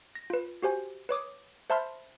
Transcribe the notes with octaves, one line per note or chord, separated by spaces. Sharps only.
A#6
F4 B4
F#4 G4 C5 G#5
B4 C#5 D6 D#6
C5 E5 A5 B5 C6 F6